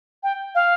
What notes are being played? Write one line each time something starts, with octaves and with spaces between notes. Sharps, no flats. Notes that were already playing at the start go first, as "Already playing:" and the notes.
G5
F5